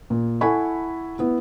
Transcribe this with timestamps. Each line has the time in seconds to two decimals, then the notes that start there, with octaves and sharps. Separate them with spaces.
0.10 A#2
0.41 E4 A4 F#5 G#5 B5 C#6
1.19 B3 E4